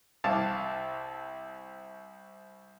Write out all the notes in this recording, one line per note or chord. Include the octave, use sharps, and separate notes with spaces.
C2 F5 A5 D6